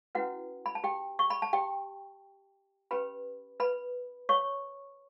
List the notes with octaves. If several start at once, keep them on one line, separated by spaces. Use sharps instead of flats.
C#4 E4 F#4 B4 F#5
B5
A5
G4 G5
C#6
B5
A5
G4 G5
C#4 G4 B4 B5
B4 B5
C#5 C#6